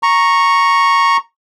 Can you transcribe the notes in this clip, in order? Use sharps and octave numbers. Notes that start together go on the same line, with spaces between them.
A#5 C#6